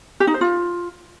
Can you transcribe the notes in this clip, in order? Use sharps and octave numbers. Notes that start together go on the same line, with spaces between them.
G4
D#4
C5
F4